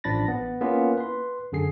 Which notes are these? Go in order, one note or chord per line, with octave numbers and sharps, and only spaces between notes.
A1 F3 D4 B5 A6 A#6
B3
A#3 B3 C#4 E4 F4
B4 C6
F#2 D3 G#4 C7